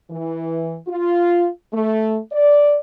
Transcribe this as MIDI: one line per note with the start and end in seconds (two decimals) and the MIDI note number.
0.11 0.77 52
0.88 1.48 65
1.73 2.18 57
2.32 2.78 74